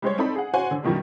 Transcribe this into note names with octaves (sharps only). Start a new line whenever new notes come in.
G3 G#3 C5 C#5
C4 D#4 A4 D5 B5
G#4 F#5
F#4 C5 C#5 F#5 G#5
D3
F#2 B2 D#3 F3 G3